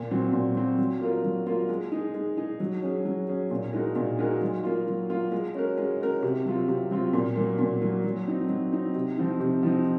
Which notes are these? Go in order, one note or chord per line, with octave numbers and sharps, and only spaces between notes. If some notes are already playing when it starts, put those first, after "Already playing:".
Already playing: A#2
F#3 C4 F#4
A#2
F#3 C4 F#4
F#3
A#3 F4 A#4
F#3
A#3 F4 A#4
G#3
D#4 G#4
G#3
D#4 G#4
F#3
C#4 G#4
F#3
C#4 G#4
A#2
G#3 D#4 F#4 A#4
A#2
G#3 D#4 F#4 A#4
F#3
A#3 F4
F#3
A#3 F4
G#3
C#4 F#4 A#4
G#3
C#4 F#4 A#4
C3
F#3 C4 F4
C3
F#3 C4 F4
A#2
F#3 A#3
A#2
F#3 A#3
F#3
C4 D#4
F#3
C4 D#4
C3
F3 C4 D#4
C3
F3 C4 D#4